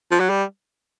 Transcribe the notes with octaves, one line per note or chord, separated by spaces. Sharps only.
F3
F#3
G3